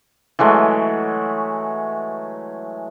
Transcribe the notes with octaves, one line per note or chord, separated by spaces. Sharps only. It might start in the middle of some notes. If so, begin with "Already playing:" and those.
E3 F#3 G#3 A3